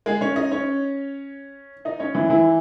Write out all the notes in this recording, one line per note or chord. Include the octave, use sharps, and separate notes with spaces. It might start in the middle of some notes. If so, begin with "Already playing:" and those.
G#3 G#4
C#4 C#5
D#4 D#5
C#4 C#5
D#4 D#5
C#4 C#5
E3 E4
E3 E4